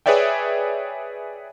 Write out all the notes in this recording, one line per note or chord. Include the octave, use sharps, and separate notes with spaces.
G#4 B4 C#5 D5 E5 G5